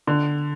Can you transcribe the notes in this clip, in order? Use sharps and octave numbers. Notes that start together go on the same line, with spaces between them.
D3